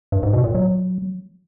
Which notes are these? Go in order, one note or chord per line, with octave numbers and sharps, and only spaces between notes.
G2
G#2
B2
A#2
F#3